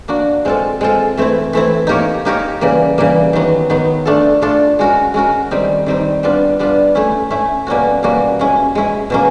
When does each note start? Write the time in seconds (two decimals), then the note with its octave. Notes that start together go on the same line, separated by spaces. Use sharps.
0.08 A#3 D4 F#4
0.45 G#3 C4 F4 A4
0.81 G#3 C4 F4 A4
1.17 E3 A3 C4 E4
1.53 E3 A3 C4 E4
1.87 A#3 D#4 G4 A#4 C#5
2.25 A#3 D#4 G4 A#4 C#5
2.61 C#3 E3 G3 A#3
2.98 C#3 E3 G3 A#3
3.33 D#3 F#3 B3
3.70 D#3 F#3 B3
4.05 A3 D4 F4 A4
4.42 A3 D4 F4 A4
4.79 G#3 C#4 F#4 A#4
5.14 G#3 C#4 F#4 A#4
5.51 D#3 G3 C4 D#4
5.86 D#3 G3 C4 D#4
6.23 G3 B3 D4 F4
6.59 G3 B3 D4 F4
6.95 A3 C#4 E4
7.31 A3 C#4 E4
7.67 B2 G3 A#3 C#4 F#4
8.03 B2 G3 A#3 C#4 F#4
8.39 G#3 C#4 E4
8.75 G#3 C#4 E4
9.10 B2 F#3 A#3 C#4